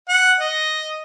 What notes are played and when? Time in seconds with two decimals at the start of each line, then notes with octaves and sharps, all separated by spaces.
0.09 F#5
0.40 D#5